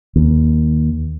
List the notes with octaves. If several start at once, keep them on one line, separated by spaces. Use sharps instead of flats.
D#2